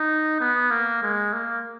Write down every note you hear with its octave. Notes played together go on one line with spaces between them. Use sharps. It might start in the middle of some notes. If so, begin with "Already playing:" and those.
Already playing: D#4
B3
A#3
G#3
A#3